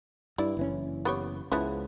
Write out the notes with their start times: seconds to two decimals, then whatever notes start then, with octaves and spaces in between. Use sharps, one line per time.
0.38 G2 E4 D5
0.57 F#1 E3 C#4
1.05 B3 G4 C#5
1.52 C#2 C#3 F3 B3 E4